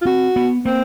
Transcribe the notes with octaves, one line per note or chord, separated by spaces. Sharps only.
F4
C4 F#4
B3
A#3 C4